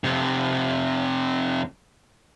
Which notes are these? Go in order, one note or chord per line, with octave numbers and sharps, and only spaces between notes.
F2 C3